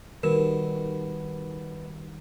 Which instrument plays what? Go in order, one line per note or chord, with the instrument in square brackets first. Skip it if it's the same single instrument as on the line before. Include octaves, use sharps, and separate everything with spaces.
[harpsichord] B2 [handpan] D#3 G3 [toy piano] A#4